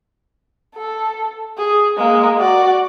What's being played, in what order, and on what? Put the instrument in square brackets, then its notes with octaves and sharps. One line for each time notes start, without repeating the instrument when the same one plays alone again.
[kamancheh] A4
G#4
G#3 A#3
F#4 D5